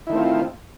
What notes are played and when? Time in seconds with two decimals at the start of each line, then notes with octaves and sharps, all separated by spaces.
0.07 E4
0.09 D#3
0.12 A3
0.15 C4
0.18 F4